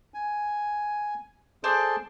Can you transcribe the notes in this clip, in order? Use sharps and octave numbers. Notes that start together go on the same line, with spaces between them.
G#5
G#4 A4 C5 D5 A5 C6